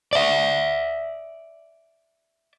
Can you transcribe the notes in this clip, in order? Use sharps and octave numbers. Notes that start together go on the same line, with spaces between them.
D5 E5